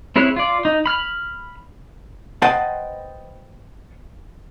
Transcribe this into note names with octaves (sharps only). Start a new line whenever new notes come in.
C4 E4 G#4 C#5 F#6
F4 D5
D#4
B5 F6
B4 C5 D#5 F#5 G5 A5